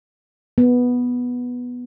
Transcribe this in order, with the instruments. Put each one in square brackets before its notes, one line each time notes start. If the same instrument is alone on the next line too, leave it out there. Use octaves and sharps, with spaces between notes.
[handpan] B3